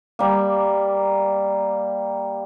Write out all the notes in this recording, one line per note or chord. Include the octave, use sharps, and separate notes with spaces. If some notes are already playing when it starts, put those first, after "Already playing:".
G3 A#3